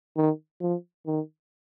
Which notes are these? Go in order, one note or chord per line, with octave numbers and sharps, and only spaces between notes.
D#3
F3
D#3